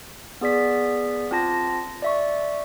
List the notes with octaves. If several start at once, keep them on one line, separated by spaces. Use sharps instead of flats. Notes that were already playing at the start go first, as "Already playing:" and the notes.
B3 G#4 D5 B6
C4 F4 A5 A#6
D5 E5 C#6